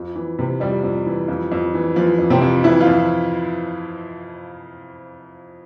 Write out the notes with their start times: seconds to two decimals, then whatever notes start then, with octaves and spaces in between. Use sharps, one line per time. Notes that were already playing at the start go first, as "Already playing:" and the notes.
Already playing: F2
0.15 E3
0.39 C3
0.60 F2 G3
0.83 F2
1.06 E3
1.28 F2
1.52 F2
1.74 E3
1.96 E3 F3
2.19 F2
2.30 C3 C4
2.41 F2
2.64 F2 E3 E4
2.80 F3 F4
2.86 F2